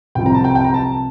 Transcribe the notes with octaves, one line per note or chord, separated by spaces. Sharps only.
C2 C3 F3 G5
A#5
A5
G5
G5
A#5
A5